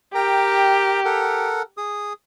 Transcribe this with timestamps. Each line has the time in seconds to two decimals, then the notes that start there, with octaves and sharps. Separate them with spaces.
0.15 G4 A#4 G5 A#5
1.05 A4 A#4 F#5
1.77 G#4 D#6